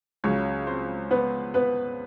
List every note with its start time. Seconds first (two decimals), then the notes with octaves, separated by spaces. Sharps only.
0.24 C#2 C#3 F#3 C#4 C#5
0.67 C4 C5
1.11 B3 B4
1.54 B3 B4